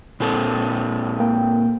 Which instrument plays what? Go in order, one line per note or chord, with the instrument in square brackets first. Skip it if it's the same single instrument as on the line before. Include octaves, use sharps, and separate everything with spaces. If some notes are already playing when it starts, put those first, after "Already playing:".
[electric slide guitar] A#2 C4 A4
[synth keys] A#3 G5